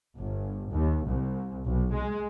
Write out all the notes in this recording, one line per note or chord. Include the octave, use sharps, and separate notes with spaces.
G1
D#2
C2
B1
G#3